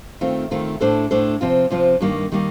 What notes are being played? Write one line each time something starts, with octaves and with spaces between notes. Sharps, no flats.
D#3 A3 C4 F4
D#3 A3 C4 F4
A2 A3 D4 A4 C5
A2 A3 D4 A4 C5
C3 F3 C4 F4
C3 F3 C4 F4
G2 D#3 G3 A#3 D#4
D#3 G3 A#3 D#4